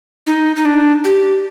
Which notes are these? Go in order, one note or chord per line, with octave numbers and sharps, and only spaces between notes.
D#4
D#4
D4
G4